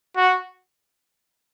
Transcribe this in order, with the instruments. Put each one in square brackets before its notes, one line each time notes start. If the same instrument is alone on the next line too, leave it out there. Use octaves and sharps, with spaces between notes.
[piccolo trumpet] F#4